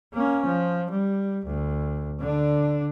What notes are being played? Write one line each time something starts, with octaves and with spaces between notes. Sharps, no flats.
A#3 C#4
F3
G3
D2
D3 D4